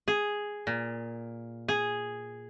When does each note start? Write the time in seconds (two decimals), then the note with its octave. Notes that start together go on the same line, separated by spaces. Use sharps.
0.08 G#4
0.67 A#2
1.68 G#4